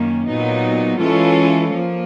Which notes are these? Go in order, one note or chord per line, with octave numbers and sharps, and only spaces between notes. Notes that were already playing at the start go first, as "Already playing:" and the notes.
Already playing: F#2 D#3 A#3 C#4
A#2 F#3 B3 D#4
E3 G#3 C#4 F4 A4
F3 A#3